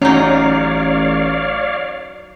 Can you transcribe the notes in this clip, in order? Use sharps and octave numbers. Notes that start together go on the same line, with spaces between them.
A1 F#3 C#4 D#4 C#5 D5 F5